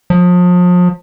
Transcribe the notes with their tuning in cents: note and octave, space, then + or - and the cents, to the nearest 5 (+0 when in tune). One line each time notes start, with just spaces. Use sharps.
F3 +35